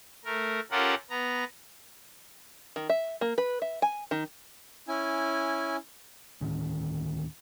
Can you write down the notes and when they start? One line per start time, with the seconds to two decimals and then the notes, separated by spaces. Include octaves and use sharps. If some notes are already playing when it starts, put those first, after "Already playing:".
0.25 A3 A#4
0.71 C#4 F4 G4 A4 A#4 F#5
1.10 B3 A#5
2.76 D#3
2.90 E5
3.21 A#3
3.38 B4
3.62 E5
3.82 G#5
4.11 D#3
4.88 C#4 E4 G#5
6.41 D2 A2 D#3 C#4